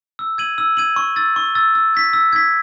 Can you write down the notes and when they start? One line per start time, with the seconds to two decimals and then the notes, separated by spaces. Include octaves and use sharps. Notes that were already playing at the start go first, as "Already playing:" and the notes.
0.19 E6
0.38 G#6 D#7 F#7
0.58 E6
0.77 G#6 D#7 F#7
0.96 C#6
1.16 E6 A6
1.36 C#6
1.55 E6 A6
1.75 E6
1.94 G#6 B6
2.13 E6
2.33 G#6 B6